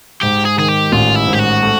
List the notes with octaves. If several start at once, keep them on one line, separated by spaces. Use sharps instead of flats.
G#2 G4
G#4
D#3 G#4
G4
A1 F4
E4
G#2
G4
F#4
A3